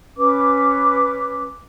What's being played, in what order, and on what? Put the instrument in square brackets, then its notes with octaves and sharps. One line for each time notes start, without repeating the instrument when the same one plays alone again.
[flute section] C#4 B4 D6